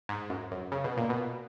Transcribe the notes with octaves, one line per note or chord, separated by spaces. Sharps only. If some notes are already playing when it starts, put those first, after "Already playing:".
G#2
F#2
F#2
C#3
B2
A#2
B2